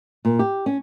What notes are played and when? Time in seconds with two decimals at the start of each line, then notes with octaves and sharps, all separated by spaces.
0.25 A#2
0.39 G4
0.66 C#4